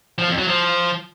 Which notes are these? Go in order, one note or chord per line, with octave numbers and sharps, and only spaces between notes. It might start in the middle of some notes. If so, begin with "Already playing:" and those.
F3
F2
F#3
F3